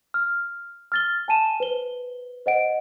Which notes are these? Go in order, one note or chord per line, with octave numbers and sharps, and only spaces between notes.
F6
F6 A6 G7
G#5 A5 D#7 E7
B4 C5 G7
C5 D#5 F#5 D7